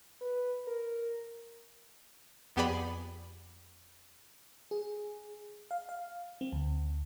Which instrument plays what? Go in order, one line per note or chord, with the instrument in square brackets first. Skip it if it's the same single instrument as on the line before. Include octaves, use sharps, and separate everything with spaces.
[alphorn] B4
A#4
[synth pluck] F2 B3 G4 G#4 D5 B5
[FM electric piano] G#4
F5
F5
C4
D2